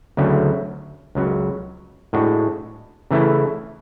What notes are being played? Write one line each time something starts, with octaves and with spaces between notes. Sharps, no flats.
D2 C#3 F#3 A3
C#2 C#3 F#3
A2 G#3 D4 F#4
C#3 E3 A3 E4